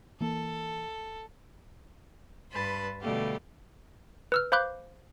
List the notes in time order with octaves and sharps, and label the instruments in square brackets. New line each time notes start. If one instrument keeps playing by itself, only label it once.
[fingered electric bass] E3 A#3 [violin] A4
[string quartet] G2 B4 A5 B5 C6
B2 D3 G3 A3 G4 F5
[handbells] B4 E6 F6
C5 F5 B5 D6 F#6 G6